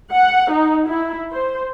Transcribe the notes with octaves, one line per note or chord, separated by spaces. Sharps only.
F#5
D#4
E4
C5